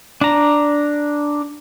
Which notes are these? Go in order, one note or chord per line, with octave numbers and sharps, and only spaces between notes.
D4 A#5